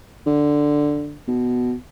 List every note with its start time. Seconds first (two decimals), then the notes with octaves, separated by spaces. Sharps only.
0.27 D3
1.28 B2